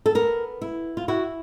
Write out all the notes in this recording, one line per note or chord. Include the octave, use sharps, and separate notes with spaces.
A4
B3 A#4
E4
F4
E4 F#4